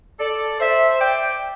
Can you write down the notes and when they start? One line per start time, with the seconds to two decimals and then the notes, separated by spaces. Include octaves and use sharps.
0.20 A4 D5
0.60 C5 E5
1.00 D5 G5